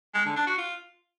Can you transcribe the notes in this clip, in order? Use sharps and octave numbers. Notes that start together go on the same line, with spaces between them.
G#3
D3
D4
F#4
F4